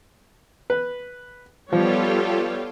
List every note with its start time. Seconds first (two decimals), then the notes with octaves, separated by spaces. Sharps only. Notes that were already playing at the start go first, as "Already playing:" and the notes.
0.70 B4
1.73 F3 G3 B3 F4 G4 A4 C#5